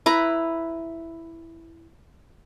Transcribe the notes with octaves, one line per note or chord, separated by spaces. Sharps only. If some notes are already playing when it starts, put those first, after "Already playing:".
E4 B4 A#5